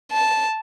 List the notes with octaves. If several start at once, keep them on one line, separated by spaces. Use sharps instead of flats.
A5